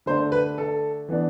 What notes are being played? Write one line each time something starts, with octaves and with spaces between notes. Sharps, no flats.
D3 A3 D4 C5
B4
A4
E3 B3 D4